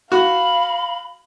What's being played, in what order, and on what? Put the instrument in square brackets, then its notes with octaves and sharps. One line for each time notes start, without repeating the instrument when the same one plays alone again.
[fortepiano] F#4 [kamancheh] F5 [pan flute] B5